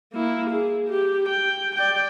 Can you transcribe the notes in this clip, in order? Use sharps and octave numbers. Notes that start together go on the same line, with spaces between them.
A#3 E4
G#4
G4
G5
D5 G5